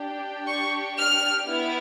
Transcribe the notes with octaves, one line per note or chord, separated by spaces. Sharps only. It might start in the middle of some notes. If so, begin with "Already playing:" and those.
Already playing: D4 G4
C#6
F6
B3 E4